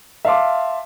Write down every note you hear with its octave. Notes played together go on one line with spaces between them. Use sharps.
E5 F5 A5 C6 D6